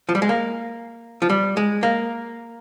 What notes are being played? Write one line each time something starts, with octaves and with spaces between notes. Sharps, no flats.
F3
G3
G#3
A#3
F3
G3
G#3
A#3